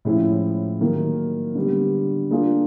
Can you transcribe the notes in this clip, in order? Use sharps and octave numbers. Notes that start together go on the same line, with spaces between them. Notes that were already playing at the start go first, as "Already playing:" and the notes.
A2 F3 G#3 C#4 E4
D#3 F#3 A#3
D3 G3 B3
A#3 D4 F4 G#4